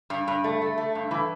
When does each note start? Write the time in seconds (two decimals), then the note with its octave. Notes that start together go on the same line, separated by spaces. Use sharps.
0.10 G2
0.28 G2
0.44 A3
0.62 A3
0.78 A3
0.95 G2
1.11 E3